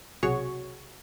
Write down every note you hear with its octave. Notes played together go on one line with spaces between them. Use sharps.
B1 C3 F#4 G#4 C#5 C#6